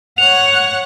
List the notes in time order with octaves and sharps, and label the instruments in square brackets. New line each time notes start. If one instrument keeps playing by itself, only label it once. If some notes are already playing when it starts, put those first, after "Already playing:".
[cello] C#5 F#5 [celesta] F7